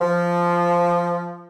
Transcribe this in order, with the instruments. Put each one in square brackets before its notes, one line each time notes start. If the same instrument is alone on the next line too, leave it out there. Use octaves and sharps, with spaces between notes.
[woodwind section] F3